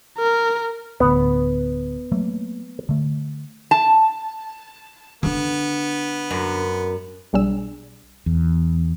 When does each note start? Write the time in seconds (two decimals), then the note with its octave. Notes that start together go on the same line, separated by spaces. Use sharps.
0.18 A#4
1.00 D1 D2 B3
2.12 F#3 A3 A#3
2.89 D3 A3
3.71 A5
5.23 D3 B3 D4
6.31 F#2
7.33 B1 G3 D4 G#4 E6
8.26 E2